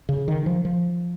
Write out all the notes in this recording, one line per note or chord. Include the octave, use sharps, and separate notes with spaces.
C#3
D#3
F3
F3